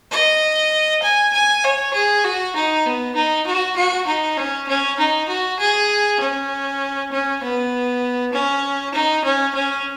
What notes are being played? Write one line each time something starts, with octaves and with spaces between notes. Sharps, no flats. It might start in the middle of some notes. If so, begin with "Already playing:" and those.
D#5
G#5
G#5
C#5
G#4
F#4
D#4
B3
D#4
F#4
F#4
D#4
C#4
C#4
D#4
F#4
G#4
C#4
C#4
B3
C#4
D#4
C#4
C#4